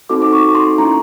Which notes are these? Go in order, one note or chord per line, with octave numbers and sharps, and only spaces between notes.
C4 D#4 F#4 A4 D6
D6
C#6
C6
A#3 C#4 E4 A#5